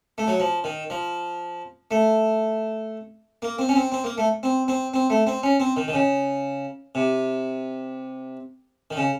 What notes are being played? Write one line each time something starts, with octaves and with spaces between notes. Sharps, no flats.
A3
F#3
F3
D#3
F3
A3
A#3
C4
C#4
C4
C4
A#3
A3
C4
C4
C4
A3
C4
C#4
C4
D#3
D#3
C#3
C3
D#3
C#3